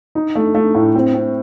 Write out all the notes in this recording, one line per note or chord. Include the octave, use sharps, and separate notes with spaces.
D#4
A3
A3
A2
C4
C4